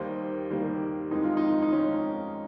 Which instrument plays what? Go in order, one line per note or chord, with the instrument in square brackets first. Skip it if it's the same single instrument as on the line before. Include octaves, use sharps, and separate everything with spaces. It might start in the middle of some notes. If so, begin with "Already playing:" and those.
Already playing: [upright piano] D#2 D#3 G3 A#3 C5
D#2 D#3 G3 A#3
F2 D#3 G#3 D#4
F4
D#4
D#4
F2 D#3 G#3 C#4